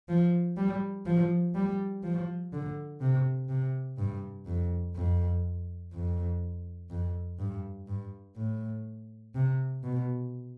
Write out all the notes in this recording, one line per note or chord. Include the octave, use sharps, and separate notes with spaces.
F3
G3
F3
G3
F3
D3
C3
C3
G2
F2
F2
F2
F2
G2
G2
A2
C3
B2